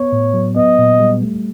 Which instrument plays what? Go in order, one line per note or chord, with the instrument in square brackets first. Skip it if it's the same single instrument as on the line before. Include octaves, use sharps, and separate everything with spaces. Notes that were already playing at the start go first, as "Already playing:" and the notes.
Already playing: [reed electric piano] B3 [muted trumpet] C#5
[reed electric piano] A2
F#3
[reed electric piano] B3 [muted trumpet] D#5
[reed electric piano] A#2
G3
A3